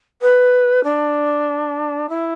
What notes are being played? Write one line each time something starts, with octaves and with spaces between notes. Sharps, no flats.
B4
D4
E4